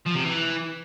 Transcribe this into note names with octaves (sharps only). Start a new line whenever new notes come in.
F3
C3
E3